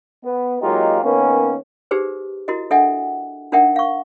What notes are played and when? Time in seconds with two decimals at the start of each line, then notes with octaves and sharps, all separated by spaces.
0.23 B3
0.61 F#3 G#3 A#3 D#4 F4 G4
1.04 D#3 A#3 B3 C#4
1.91 D#4 G4 G#4 B4 C5
2.48 E4 F#4 A#4 D#5
2.71 D4 A4 D#5 E5 F#5 G#5
3.52 D4 D#4 A#4 E5 F#5 G5
3.76 F5 C#6